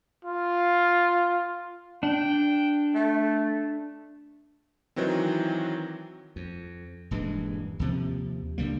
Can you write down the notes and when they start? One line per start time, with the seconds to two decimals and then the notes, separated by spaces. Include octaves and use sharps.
0.25 F4
2.03 D4 G5
2.94 A3
4.96 D#3 E3 F#3 C4
6.36 F2
7.11 D#1 G2 E3 G#3
7.79 D#2 C3 F3
8.58 C#2 D3 G3 A#3